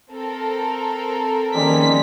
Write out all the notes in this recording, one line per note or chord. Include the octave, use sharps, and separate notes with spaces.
C4 A4 A#4
D#3 F3 G3 G#3 A#3 C#4 A#5 B6